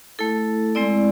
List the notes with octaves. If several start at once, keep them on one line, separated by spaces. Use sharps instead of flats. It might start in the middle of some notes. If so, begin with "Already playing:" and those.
A3 E4 A4
G#3 C4 E4 D5